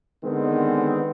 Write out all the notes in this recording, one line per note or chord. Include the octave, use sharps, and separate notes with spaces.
D3 D#3 G#3 B3 C4